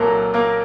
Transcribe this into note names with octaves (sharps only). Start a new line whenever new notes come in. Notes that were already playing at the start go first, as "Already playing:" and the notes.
Already playing: C2 A#2 F#3 A4 A#4 A#5
A#3 A#4